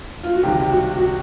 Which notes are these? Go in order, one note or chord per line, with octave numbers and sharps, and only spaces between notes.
F4
F#4
C#2 C3 D#3 G3 G4
G4
F#4
F#4